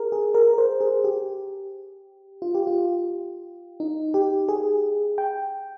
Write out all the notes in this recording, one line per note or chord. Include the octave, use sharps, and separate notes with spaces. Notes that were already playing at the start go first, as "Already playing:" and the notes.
Already playing: G#4 A#4
G#4
A#4
A#4
C5
G#4
G4
F4
G4
F4
D#4
G4
G#4
G5